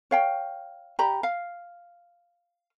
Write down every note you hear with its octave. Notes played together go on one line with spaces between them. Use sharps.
C#5 F5 G5
G4 D5 A#5 B5
F5